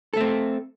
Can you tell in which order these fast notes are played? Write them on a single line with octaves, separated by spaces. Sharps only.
A4 A3 C4